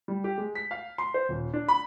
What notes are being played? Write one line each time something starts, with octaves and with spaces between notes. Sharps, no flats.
G3
G4
G#3
B6
F5
C6
C5
D#1
D4
B5